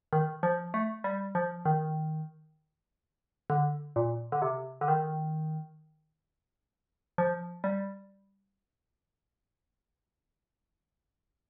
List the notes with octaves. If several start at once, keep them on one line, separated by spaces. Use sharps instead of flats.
D#3
F3
A3
G3
F3
D#3
D3
A#2
D3
C3
D3
D#3
F3
G3